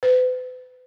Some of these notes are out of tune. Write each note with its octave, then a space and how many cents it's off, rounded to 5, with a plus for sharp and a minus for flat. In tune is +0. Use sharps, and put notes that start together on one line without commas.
B4 +40